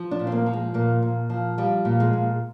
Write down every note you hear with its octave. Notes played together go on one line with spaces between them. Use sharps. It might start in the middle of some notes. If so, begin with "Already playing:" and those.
Already playing: F3
D4
A#2
C4
A#3
F3
G#3
A#2 A#3
A#2
F3
F3 G3
A#2
G#3
A#2